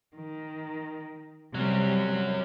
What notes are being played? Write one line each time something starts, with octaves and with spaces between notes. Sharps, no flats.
D#3
C3 F#3 G3 C#4